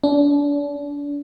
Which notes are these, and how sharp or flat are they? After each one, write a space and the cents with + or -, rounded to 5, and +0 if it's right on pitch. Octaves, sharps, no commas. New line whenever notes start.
D4 -35